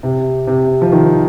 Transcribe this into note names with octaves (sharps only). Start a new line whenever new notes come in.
C3
C3
F3
D#3